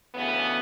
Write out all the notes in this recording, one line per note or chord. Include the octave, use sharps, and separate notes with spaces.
D2 C#3 E3 B3